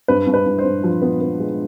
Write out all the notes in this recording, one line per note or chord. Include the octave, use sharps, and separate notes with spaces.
G2 B4
G2
B4
G2
C5
G2
F3
B3
B3
G#3